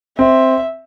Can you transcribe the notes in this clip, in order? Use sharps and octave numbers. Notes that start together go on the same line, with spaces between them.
C4 E5